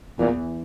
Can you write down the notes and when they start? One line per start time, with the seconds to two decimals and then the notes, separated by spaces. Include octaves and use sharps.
0.19 E2 A#2 E3